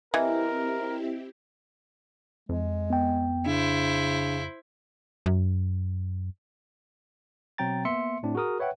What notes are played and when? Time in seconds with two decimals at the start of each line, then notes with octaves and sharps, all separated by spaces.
0.14 E3 C4 E4 G4 A#4 D#5 E5
2.49 F2 G#3
2.90 B3 G5
3.46 C#3 D4 E4 C5
5.26 F#2
7.58 B2 F#3 C4 G5 A#5 A6
7.85 A#3 B3 E5 C6 C#7
8.23 A2 C4 D4
8.35 F#4 G#4 A#4 D#6
8.59 B4 C#5 E5 F#5 G5